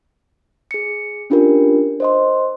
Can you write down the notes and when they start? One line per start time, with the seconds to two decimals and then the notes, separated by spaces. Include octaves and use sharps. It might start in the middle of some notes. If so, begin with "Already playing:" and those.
0.71 G#4 C#7
1.30 C#4 D4 F4 G4 A#4
2.00 C5 D#5 C6